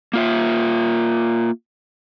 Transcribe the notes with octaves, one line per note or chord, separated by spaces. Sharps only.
A#3 F4 E5